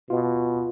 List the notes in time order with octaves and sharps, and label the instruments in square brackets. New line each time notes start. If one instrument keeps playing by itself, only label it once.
[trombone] B2 [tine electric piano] F4